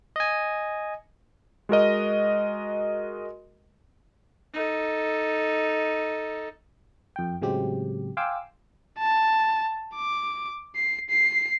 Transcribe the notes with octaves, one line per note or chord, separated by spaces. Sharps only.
D#5 G#5
G#3 F#4 A#4 D#5
D#4 A4
F2 G5
A2 C#3 F#3 G#3 C4 G4
F5 G5 G#5 C6 D6 E6
A5
D6
C7
C7